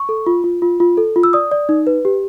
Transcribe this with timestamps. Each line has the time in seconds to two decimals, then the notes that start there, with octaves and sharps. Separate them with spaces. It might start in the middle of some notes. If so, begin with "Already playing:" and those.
Already playing: C#6
0.09 A4
0.26 F4
0.44 F4
0.62 F4
0.80 F4
0.97 A4
1.16 F4
1.23 E6
1.33 D5 D#6
1.51 D5
1.69 D#4
1.87 B4
2.05 G4